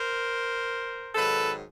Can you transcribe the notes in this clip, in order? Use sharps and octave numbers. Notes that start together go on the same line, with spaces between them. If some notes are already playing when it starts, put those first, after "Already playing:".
Already playing: A#4 C5
G#2 D#3 F#3 A4 B4